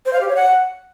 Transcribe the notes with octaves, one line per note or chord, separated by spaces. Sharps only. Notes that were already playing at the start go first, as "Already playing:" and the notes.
C5
F5
G4
C#5
F#5